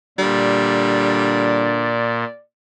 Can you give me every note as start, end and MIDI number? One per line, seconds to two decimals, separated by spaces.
0.18 2.24 46
0.18 2.00 50
0.18 1.75 55
0.18 2.40 74